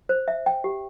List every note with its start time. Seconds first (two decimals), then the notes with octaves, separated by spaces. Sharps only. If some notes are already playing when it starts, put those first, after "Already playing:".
0.09 C5
0.28 E5
0.46 G5
0.64 G4